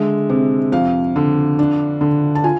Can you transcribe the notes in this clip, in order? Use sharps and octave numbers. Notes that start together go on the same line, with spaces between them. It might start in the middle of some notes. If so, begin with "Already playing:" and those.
Already playing: D3 G#3 E5
C3
F2 F5
D3
D4
D3
A5
F4 G#5